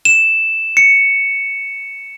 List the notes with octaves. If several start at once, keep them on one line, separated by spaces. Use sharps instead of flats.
E7
C#7